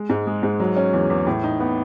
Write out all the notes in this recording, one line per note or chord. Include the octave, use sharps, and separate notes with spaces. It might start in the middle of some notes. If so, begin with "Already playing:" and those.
Already playing: G#3
G#2
G#3
G#2
F#3
C#4
E2
E2
A2
D#4
B3